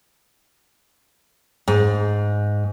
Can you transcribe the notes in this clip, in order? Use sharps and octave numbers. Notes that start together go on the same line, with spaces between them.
G#2